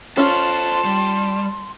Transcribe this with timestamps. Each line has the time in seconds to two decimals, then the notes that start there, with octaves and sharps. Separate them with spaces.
0.17 C#4 F4 A4 C5 A5 C6
0.85 G3